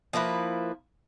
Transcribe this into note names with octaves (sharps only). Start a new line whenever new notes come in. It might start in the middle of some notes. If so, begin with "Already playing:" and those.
F3 A#3 E4 B4